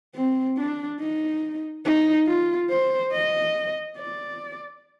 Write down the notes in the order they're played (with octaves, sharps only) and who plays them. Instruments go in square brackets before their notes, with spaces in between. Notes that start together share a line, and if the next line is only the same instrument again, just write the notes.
[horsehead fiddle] C4
D4
D#4
D#4
F4
C5
D#5
D5